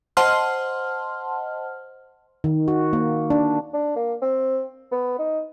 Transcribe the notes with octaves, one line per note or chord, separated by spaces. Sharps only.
C5 D#5 F#5 A5 C6 F6
D#3
F#4
A#3
D4
D4
A#3
C4
B3
D#4